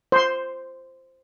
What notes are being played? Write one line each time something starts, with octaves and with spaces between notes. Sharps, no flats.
C5 C6